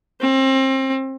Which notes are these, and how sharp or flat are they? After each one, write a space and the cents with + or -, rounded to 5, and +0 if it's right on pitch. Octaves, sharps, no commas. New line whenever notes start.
C4 +30